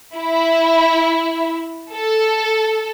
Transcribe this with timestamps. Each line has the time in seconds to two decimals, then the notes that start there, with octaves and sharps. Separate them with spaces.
0.15 E4
1.93 A4